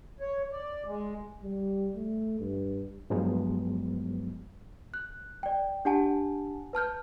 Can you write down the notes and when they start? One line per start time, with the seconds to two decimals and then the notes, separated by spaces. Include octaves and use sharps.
0.21 C#5
0.52 D5
0.87 G#3
1.43 G3
1.96 A3
2.40 G2
3.10 G2 F3 F#3 G#3 B3
4.94 F#6
5.43 D5 G5
5.85 D4 G4 F#5 G#5 A5
6.73 B4 A5 F6 G6